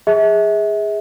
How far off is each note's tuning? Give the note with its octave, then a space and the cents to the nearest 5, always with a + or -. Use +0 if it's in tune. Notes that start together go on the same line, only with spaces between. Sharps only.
G#4 -15 E5 -35